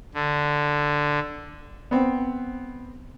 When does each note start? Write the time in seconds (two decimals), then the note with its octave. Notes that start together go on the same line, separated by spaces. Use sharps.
0.14 D3
1.91 B3 C4